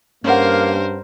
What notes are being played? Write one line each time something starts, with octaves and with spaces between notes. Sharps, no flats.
G2 A#3 C#4 A#4 C5 F#5